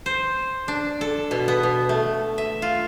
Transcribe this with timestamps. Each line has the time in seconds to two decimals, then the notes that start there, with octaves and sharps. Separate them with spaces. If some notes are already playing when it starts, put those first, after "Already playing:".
0.06 C5
0.68 D4
1.01 A4
1.31 B2
1.48 B3
1.63 B2
1.89 A3
2.38 E5
2.62 F4